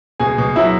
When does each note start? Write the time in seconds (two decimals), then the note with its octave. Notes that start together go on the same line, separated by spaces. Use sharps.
0.20 B2 G#4 G#5
0.38 B2
0.56 F#3 E4 E5